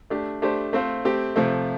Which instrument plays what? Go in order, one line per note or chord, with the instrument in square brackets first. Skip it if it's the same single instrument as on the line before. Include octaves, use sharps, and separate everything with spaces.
[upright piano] A3 D4 G4
A3 D4 G4 C5
A3 C4 F4 C5
A3 C4 G4
C3 F3 A3